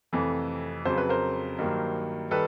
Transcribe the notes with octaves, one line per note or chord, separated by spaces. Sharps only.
F2 C3 E3 A3
F2 C#3 F#3 C5
B4
A#4 C5
G2 D#3 F#3 A#3
D#3 G3 A4 B4